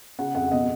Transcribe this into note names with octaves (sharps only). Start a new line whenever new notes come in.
C#3 F#5
F2 F#5
B2 D#5